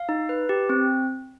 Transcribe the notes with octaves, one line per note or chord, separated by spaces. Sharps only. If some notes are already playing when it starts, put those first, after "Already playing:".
Already playing: F5
D#4
B4
G4
C4